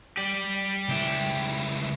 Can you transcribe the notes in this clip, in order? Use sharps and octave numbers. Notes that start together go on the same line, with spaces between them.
G4 D5
C#2 E4